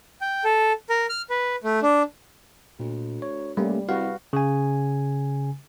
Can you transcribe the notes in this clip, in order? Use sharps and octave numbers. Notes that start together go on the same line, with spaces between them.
G5
A4
A#4
F6
B4
A3
D4
D2 A#2
C#5
G3 A3 A#3 C#4
C2 F#4 B4 F5
C#3 G#5